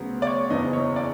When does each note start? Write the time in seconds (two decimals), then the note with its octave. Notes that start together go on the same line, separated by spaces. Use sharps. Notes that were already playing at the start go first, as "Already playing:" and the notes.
Already playing: D2 C#3 F#3 B3
0.22 D5
0.27 C#5
0.50 F#1 E2 C#3 E3 D#5
0.73 C#5
0.96 D5